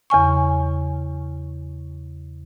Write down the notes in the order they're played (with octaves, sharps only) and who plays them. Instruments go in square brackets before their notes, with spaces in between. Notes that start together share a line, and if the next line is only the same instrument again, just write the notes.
[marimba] E2 C#3 G#5 C#6